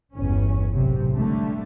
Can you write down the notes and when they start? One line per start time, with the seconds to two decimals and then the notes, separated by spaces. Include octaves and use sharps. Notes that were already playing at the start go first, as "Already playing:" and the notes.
0.13 G1 E2 C#4
0.74 B1 A2 C3
1.15 D3 G3 A3